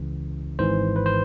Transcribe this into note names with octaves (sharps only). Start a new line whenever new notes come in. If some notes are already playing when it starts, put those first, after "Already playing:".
Already playing: C#2 C#3 E3
G#1 G#2 E3 C5
B4
C5